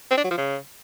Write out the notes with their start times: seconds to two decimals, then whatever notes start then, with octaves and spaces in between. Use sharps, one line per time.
0.11 C4
0.18 D4
0.24 F#3
0.31 F3
0.38 C#3